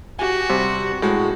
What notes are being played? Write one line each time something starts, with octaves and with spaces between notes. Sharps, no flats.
F#4 G4 G#5
C3 G3
A2 G#3 F#4